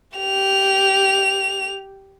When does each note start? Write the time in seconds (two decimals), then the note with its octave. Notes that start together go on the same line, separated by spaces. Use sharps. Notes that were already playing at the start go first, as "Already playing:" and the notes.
0.17 G4 F7